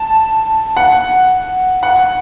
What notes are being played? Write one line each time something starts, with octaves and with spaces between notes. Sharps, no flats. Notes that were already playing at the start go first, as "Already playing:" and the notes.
Already playing: A5
F#5
F#5